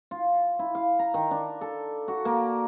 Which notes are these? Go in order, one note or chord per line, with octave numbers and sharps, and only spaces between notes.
F4
E4
F5
A#5
D#3
D4
A4
F#4
A#3